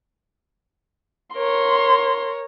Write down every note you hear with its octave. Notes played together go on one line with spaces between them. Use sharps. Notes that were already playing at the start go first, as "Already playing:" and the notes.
A#4 C#5 C6